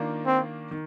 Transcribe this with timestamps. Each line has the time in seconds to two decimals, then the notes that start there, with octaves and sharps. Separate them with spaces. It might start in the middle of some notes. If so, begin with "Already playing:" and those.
Already playing: D#3 A#3 D4 F4
0.26 C4
0.71 D#3